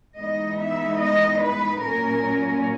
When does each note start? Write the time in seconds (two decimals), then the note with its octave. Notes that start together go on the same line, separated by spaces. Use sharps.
0.18 E3 G#3 B3 D#4 D#5
0.59 E5
1.00 D#5
1.41 B4
1.81 A#2 F#3 C#4 A#4